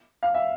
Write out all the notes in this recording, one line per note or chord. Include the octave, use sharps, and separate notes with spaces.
F5
E5